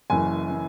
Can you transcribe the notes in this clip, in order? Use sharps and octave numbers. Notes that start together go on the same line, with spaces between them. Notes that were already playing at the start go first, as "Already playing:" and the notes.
F#1 F#2 E3 G#5
E3